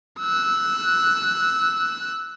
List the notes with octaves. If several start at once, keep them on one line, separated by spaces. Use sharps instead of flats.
E6 F#6